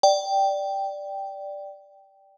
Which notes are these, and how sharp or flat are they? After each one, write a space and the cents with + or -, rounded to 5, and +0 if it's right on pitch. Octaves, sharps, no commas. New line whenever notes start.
D5 +0 G5 -5